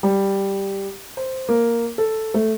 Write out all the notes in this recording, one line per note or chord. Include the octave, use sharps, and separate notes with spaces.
G3
C5
A#3
A4
A3